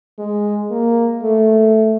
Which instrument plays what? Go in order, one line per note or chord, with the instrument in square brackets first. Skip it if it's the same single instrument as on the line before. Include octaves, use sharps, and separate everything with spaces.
[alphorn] G#3
A#3
A3